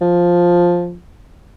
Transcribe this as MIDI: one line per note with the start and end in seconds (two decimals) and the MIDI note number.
0.01 0.97 53